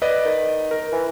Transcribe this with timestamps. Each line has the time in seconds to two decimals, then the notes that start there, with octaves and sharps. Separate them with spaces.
0.02 B4 D5 D#5
0.25 D#3
0.71 A#4
0.92 E3